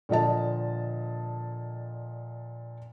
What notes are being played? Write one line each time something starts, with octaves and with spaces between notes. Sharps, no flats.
A#2 D3 F3 D#5 A5